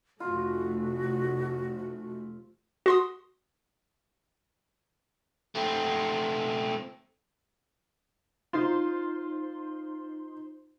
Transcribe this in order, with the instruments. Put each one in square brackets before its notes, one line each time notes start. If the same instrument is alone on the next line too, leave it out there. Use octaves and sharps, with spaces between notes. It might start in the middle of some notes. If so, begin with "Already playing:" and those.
[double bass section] F1 A3 [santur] F4 [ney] F#4
[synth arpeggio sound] F#4 C6 D#6
[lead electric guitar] A3 C4
[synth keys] D#4 C5 C6 [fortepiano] F4